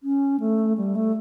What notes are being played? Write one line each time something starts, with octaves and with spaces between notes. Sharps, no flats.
C#4
A3
G3
A3